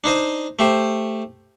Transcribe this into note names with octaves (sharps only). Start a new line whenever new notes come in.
D4 D#4 C5 D#5
A3 G4 C5